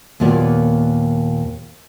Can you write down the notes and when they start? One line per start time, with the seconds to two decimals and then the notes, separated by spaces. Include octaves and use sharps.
0.20 D#2 A#2 B3 F4 C#5 D5